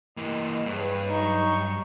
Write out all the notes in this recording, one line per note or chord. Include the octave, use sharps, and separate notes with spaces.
E3 A#3 D#5
G2 G#4 B4 C#5
F#3 D#4 C#6 G6